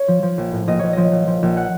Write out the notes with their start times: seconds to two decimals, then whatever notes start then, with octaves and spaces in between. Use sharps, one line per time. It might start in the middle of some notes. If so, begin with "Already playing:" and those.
Already playing: C#5
0.08 F3
0.23 F3
0.38 A#1
0.52 A2
0.67 A#1 D#5
0.79 A#1 C#5
0.93 F3 D#5
1.12 A#1
1.27 F3
1.42 A#1
1.57 F#5